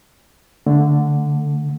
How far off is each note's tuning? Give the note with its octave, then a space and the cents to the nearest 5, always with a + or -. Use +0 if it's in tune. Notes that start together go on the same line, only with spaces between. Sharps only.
D3 +0 A3 +15